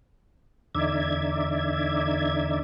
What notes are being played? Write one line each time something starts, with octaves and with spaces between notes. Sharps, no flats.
E2 D3 D#4 D5 E5 G#6